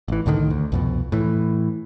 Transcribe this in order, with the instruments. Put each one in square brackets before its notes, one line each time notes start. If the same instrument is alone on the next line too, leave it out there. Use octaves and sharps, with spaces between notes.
[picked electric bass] A1 E3
C2 A2 D3 D#3
D2
C2 F2 B2
A2 E3